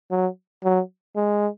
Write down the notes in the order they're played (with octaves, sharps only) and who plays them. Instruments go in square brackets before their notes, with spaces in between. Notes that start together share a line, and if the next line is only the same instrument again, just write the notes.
[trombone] F#3
F#3
G#3